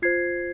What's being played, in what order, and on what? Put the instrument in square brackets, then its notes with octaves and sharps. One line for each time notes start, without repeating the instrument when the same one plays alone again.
[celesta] F4 C5 G#6 C7